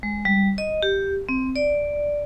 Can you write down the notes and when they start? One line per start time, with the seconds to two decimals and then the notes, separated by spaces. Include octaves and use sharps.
0.03 G#3
0.25 G3
0.58 D#5
0.83 G4
1.29 C4
1.56 D5